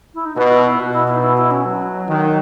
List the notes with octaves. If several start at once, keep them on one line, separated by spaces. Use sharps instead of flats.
E4
D#4
B2 F#4
E4
E4
B2 F#4
E4
E4
D#4
E4
E4
C#4
F#3
D#3